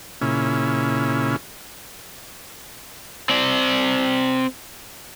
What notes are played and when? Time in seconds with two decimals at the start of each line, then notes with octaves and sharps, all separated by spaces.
0.21 A#2 C#3 C#4 E4
3.29 C4 D5